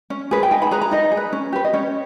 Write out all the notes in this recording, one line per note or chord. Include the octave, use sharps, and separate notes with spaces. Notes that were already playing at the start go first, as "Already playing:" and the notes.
C#4
G#4 B4
G5
D#4 G#5
B5
G#4 B4 A#5
A#5
D#4 D#5
G#4
B4
C#4
G4 B4
D#5
C#4 C#5